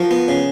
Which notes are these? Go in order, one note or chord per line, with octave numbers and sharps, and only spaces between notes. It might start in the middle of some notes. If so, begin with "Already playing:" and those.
Already playing: F3 F#4 A#4
B3
C#3